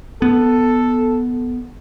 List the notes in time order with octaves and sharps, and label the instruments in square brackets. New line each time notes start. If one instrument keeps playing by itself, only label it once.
[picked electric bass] B3 [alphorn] A4